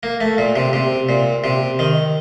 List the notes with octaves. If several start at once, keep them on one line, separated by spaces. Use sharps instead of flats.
A#3
A3
A#2
C3
C3
A#2
C3
D#3